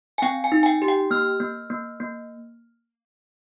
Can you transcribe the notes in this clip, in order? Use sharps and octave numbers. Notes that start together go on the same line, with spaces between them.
G#5
C4 G5
G#5
D#4
G#5
G5
G4
G5
A#3 F6
A#3
A#3
A#3